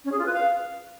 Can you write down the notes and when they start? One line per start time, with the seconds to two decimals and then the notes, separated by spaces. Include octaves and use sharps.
0.05 C#4
0.12 G#4
0.19 F4
0.26 B4
0.33 F5